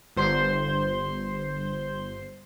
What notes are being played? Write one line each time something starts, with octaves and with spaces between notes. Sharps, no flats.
G1 C5 C6